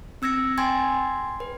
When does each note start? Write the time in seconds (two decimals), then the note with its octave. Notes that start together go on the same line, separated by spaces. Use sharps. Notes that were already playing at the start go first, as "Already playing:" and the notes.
0.22 C4 E6 G#6 A#6 C#7
0.58 G5 G#5 C6 G#6 A6
1.40 B4